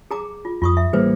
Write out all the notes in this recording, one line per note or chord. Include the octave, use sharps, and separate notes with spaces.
G#4 A#5 D6
F4
F2 F4 C#6 D#6
E5
A1 G3 A#3 G#4 B4 C5